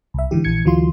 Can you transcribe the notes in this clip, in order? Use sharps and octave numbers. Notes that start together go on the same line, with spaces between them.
C2 E5
G#2 D3 E3 G4
A#1 E3 G#6 C#7
D2 E3 F#3 F4 C6